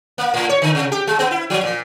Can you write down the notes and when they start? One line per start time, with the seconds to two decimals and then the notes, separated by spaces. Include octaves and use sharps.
0.18 A#3
0.34 A2
0.49 C#5
0.62 D3
0.75 C3
0.92 G4
1.07 G#3
1.19 B3
1.31 E4
1.50 F3
1.63 A#2